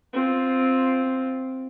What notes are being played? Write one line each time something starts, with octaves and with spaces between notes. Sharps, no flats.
C4 F4